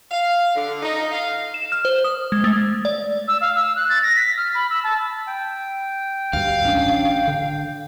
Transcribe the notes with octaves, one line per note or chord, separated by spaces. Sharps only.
F5
D3
D#4
F5
E7
F6
C5
D#6
G#3
A3
D5
E6
F5
E6
F#6
A6
A#6
B6
F6
B5
E6
A5
G5
D2 G2 F5
A1 C#4 D4
D3